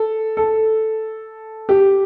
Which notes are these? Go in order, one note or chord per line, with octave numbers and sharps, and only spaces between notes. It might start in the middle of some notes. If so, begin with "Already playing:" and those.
Already playing: A4
A4
G4